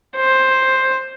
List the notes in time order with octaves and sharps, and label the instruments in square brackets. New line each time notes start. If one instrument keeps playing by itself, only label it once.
[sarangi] C5